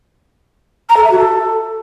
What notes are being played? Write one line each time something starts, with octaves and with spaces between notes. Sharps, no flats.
A#5
A4
E5
F#4
A4